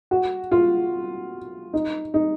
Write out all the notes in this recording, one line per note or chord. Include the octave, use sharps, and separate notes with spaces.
F#4
F4
D#4
D#4